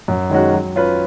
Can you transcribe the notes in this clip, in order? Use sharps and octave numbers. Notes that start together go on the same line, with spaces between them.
F#2
D#3 G#3 C#4 F#4
F#3
C#4 F4 B4